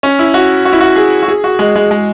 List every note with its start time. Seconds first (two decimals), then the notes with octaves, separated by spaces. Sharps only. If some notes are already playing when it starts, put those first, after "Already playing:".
0.03 C#4
0.19 E4
0.34 F#4
0.65 F#4
0.72 E4
0.80 F#4
0.96 G#4
1.23 F#4
1.28 G#4
1.44 F#4
1.59 G#3
1.76 G#3
1.91 G#3